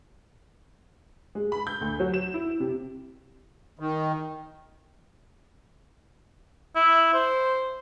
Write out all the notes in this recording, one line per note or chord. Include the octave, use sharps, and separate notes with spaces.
G#3
B5
G6
D2
F#3
E7
E4
C3
D#3
E4
C5